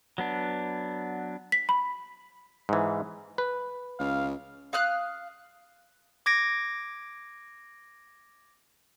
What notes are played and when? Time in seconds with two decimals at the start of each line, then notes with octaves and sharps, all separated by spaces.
0.18 F#3 B3 D4
1.52 B6
1.69 B5
2.69 G#2 E3
3.38 B4
3.99 C#2 F5
4.73 F5 D#6 F6 F#6
6.26 D6 G#6 A#6 D7